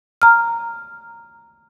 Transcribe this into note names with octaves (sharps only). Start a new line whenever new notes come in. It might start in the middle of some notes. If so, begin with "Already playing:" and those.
A#5 F6